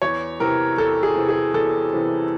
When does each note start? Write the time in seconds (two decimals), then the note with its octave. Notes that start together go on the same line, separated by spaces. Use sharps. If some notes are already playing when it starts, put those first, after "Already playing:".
0.02 E2 C#5
0.40 C3 E3 A#4
0.77 E2 A4
1.03 G#4
1.16 C3 E3
1.29 G#4
1.54 E2 A4
1.93 C3 E3